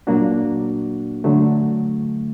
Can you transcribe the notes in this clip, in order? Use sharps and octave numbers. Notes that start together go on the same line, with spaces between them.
A#2 F#3 A#3 D4 F#4
D3 F#3 A3